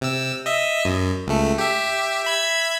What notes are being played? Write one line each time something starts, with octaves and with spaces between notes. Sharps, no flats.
C3 E6
D#5 E5
F#2
C#2 A3
G4 E5
E5 B5 G#6